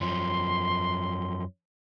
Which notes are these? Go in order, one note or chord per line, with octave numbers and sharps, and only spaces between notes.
F#2 F3 C6